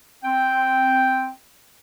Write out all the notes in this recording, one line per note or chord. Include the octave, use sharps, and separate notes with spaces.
C4 G5